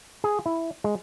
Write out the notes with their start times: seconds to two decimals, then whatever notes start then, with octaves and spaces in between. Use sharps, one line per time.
0.24 G#4
0.46 E4
0.84 G#3